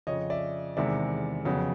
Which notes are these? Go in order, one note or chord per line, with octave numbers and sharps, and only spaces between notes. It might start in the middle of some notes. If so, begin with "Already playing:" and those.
F2 C#3 F3 C#5 D#5
D5 E5
E2 C3 D#3 G#3 D5 E5
F2 C#3 F#3 B3